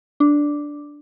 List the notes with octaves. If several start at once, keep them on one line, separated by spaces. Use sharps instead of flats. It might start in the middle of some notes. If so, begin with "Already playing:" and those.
D4